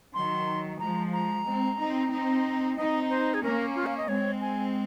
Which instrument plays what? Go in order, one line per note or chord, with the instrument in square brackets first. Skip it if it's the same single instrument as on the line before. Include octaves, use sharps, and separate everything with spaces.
[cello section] D#3 F#3 [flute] C6
[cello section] F3 G#3 [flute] A#5
[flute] A#5
[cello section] G#3 C4
C4 D#4
C4 D#4
[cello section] C4 D#4 [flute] D#5
[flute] C5
G#4
[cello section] A#3 C#4 [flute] A#4
[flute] F4
F5
D#5
[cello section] G#3 C4 [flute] C#5
[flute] G#5